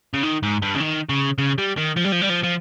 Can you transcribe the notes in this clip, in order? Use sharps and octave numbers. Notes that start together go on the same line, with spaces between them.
C#3
D#3
G#2
G2
C#3
D#3
C#3
C#3
G3
D#3
F3
G3
F3
G3
F3
F3